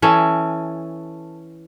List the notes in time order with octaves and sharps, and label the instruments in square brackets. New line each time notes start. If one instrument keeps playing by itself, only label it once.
[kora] E3 C#4 A4